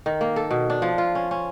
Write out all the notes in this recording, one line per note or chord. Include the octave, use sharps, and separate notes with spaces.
D#3
A#3
A4
B2
D4
F3
F4
C#4
C#4